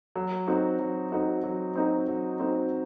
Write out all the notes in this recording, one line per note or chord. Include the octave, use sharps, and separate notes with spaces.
F#3
C4 D#4 F#4
F#3
C4 D#4 F#4
F#3
C4 D#4 F#4
F#3
C4 D#4 F#4